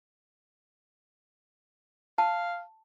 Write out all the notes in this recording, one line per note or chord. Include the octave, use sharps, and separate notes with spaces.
F5 A5